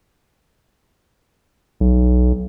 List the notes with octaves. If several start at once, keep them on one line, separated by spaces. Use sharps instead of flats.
B1